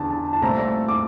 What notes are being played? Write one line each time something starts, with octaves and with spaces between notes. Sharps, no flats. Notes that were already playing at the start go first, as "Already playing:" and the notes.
Already playing: E2 D3 D4 A5
A5
A5
C2 A#2 A3 C4 A#5
D6